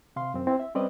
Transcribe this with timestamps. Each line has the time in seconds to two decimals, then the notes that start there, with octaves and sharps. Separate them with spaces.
0.16 C3 F5 C6
0.34 F#2 C4
0.47 C4 E4
0.60 E5
0.75 G3 C4 C#4 B4 D5 D#5